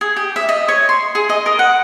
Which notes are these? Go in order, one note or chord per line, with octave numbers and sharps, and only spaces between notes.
G#4
G4
E5
D#5
C#5
C6
G#4
D#5
A#4
F#5